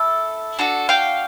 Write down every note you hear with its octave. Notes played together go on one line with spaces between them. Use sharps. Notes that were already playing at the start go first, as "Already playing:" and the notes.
Already playing: E4 A4
D4 F#4 A4
F5 G5